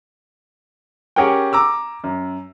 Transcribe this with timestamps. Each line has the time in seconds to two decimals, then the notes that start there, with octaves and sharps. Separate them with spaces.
1.16 C#4 G4 G#4 A#4 F#5 G5
1.53 A#5 D6 E6
2.04 F#2